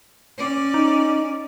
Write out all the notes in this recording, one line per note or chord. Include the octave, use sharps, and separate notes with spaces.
C#4 D5
D#4